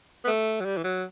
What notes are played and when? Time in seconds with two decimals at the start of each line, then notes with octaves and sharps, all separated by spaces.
0.24 B3
0.27 A3
0.61 F#3
0.65 G3
0.77 E3
0.84 F#3